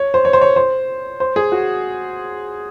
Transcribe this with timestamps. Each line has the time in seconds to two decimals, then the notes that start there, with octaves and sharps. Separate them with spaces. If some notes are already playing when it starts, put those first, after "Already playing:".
Already playing: C#5
0.14 C5
0.25 C#5
0.33 C5
0.41 C#5
0.56 C5
1.20 C5
1.36 G#4
1.52 F#4